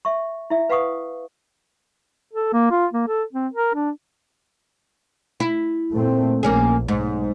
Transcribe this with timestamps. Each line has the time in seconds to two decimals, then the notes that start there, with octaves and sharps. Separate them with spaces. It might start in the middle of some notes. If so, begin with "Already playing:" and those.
0.05 E5 C#6
0.50 E4 E5
0.69 B4 F5 F#5 C#6 D#6
2.33 A4
2.53 A#3
2.71 F4
2.94 A#3
3.08 A4
3.33 C4
3.53 A#4
3.74 D4
5.40 E4
5.92 A#2 A3 C4
6.43 A#1 A#3 C#4 G#4
6.88 B1 G#2